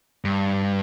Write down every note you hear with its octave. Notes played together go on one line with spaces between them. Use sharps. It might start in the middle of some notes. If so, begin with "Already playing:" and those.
G2